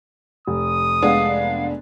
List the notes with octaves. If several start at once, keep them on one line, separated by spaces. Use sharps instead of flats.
F1 D#6
G#3 B3 D4 F5